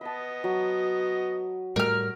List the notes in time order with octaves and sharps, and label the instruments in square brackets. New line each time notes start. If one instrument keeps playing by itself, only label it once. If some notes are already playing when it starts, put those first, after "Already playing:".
[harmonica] B3 D#5 [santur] A5 B5
[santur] F#3
[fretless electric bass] A2 G3 A3 [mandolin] A#4 F6